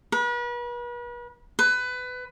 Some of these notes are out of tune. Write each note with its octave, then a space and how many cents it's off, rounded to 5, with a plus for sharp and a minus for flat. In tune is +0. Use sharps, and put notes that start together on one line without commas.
B4 -40
B4 +20